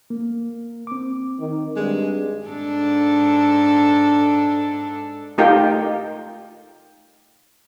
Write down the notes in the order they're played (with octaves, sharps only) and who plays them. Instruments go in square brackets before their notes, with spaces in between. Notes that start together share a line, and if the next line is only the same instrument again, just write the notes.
[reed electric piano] A#3
C4 D6
[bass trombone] D#3
[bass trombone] G2 [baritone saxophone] G#3
[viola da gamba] G#2 D4 A4
[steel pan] A3 D#4 F4 G4 A#4 G5